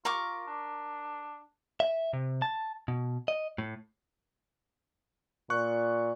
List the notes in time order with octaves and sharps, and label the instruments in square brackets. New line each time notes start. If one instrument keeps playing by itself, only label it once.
[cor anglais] F4 [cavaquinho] A#4 C#6 D6
[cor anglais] D4
[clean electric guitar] E5
C3
A5
B2
D#5
A2
[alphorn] A#2 [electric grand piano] C#6 F#6